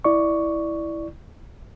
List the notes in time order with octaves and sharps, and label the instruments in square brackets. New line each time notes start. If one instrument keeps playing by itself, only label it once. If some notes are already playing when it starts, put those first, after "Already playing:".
[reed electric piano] E4 D5 C#6